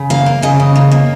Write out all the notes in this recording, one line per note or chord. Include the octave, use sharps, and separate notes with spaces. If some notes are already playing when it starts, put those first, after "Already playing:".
Already playing: C#3
A#3 F5
A#3
C#3 D#5
C#3
A#3
A#3